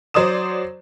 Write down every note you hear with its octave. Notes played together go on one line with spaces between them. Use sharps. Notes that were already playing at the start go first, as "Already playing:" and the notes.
F#3 C5 D5 D#6 E7